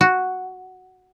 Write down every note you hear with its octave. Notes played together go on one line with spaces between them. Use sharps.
F#4